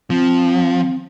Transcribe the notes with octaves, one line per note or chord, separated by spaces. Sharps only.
F3 C4